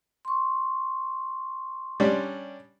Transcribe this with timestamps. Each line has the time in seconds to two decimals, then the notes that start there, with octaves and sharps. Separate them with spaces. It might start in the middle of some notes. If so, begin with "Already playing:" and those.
0.25 C6 C#6
2.00 G3 C#4 D4